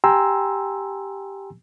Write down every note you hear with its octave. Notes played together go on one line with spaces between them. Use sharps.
G4 G5 G#5 A#5 C6 E6